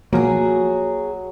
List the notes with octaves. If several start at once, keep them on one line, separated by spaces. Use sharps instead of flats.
B1 F3 F#3 A#3 F#4 G#4